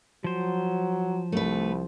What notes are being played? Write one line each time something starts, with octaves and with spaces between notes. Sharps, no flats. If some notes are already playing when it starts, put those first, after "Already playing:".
F3 F#3 C5
C2 A3 B4